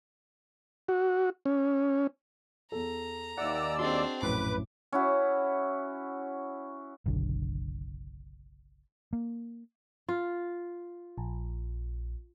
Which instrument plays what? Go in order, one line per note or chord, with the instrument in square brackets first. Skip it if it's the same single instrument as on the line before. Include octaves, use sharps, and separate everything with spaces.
[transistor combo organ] F#4
C#4
[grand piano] E2 A4 [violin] A#5
[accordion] D#2 D5 E6 [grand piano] E5 D6 [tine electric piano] F#5
[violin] C4 D4 [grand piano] F#4 G#4 D#5 [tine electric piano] C6
[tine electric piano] A#1 F#2 A2 [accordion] B4 [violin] D6
[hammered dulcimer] C#4 E4 F#4
[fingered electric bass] F#1 B1 D3
A#3
[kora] F4
[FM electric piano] A#1